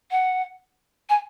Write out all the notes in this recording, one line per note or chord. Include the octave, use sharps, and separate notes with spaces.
F#5
G#5